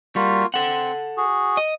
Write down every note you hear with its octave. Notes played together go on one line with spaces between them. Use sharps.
G3 A#3 F4 F#4
C4 A4 F#5
F#4 G#4
D#5